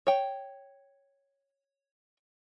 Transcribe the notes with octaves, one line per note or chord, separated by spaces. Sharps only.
C#5 G5